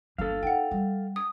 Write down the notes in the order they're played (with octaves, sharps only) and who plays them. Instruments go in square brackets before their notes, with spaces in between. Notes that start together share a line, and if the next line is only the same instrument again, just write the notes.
[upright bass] G1 A#3 [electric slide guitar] A4 F5
[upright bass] D#4 [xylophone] F#5 G5
[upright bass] G3
[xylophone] D#6